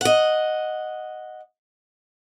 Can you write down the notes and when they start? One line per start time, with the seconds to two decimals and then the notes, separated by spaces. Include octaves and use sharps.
0.01 D#5 F#5